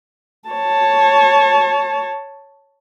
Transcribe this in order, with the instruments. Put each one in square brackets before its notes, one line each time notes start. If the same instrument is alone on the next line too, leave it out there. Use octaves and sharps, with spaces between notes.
[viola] C#5 A5